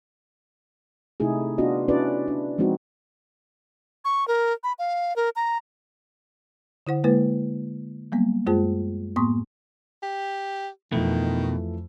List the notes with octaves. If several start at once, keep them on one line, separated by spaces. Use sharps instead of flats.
C3 A3 D#4 E4 G#4
B3 D4 F4 F#4 D#5
C#4 D4 E4 F#4 B4 D5
D4
F3 G#3 C4 D#4 F#4
C#6
A#4
B5
F5
A#4
A#5
D3 E4 C5 F#5
D3 G#3 A#3 E4 B4
F#3 G3 A#3 B3
F#2 G#3 F4 G#4 C5 A5
A2 A#3 B3 C6 C#6 D#6
G4
F2 B2 D#3 E3 A3